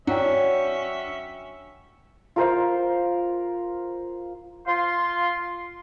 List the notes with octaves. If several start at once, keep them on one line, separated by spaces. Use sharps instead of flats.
F#3 C#4 D4 E5 G5
F4 A#4 C5 F5
F4 C6